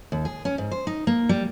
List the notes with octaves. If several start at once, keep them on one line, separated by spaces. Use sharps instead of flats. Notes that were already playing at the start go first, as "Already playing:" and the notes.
D#2
G#4
C#4
G#2
C5
D#4
A#3
G3